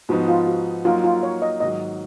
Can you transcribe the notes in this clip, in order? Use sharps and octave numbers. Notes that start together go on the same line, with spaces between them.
G#2 F3 B3 D#4 F#4
F4
F#4
F#3 A#3 D#4 F4 A#4
F4
C#5
D#5
G#2 D#3 F#3 D#5